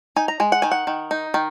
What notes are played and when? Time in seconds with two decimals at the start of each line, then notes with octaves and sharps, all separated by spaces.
0.16 D#4 G#5
0.28 A#5
0.40 G#3 G#5
0.52 F#5
0.62 D#3 G#5
0.71 F#5
0.87 D#3
1.11 D#4
1.34 D#3